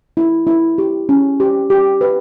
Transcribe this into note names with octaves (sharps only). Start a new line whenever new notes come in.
E4
E4
G4
C#4
G4
G4
B4